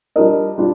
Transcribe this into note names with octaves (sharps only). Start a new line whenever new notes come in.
G3 D4 F4 A#4 D#5
G3 D4 F4